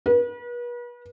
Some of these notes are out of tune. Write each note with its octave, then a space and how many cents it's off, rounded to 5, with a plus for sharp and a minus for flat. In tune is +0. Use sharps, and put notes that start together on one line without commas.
B4 -40